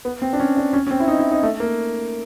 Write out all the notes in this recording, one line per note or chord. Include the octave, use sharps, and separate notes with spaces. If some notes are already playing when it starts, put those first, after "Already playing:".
B3
C4
D4
C#4
D4
C#4
C#4
C4
E4
D#4
E4
D#4
A3
A#3